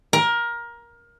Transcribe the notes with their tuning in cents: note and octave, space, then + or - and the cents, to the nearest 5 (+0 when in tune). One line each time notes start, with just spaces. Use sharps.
A#4 +20